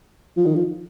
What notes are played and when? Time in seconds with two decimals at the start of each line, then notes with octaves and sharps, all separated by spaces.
0.37 F3
0.46 D#3
0.56 F3